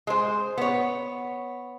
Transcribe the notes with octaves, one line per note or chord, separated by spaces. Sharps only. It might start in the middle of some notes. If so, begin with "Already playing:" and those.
G#3 C5
B3 C#5